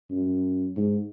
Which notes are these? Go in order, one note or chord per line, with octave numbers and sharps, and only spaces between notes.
F#2
G#2